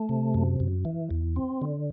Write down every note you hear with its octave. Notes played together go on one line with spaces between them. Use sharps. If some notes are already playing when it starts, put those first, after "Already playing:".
Already playing: A3
C3
F#2
F#2
E3
E2
C4
D3